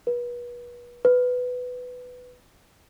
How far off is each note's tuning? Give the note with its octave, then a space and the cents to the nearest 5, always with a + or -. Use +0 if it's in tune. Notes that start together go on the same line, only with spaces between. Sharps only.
B4 -35
B4 +10